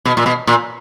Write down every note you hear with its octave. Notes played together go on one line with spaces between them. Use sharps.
B2
A#2
B2
A#2